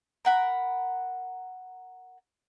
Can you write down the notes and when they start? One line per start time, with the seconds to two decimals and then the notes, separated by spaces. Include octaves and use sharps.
0.25 A#4 F#5 B5